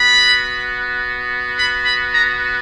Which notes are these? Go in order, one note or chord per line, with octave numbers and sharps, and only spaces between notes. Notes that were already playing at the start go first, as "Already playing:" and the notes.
Already playing: B3 F#4 B5
B5
B5
A#5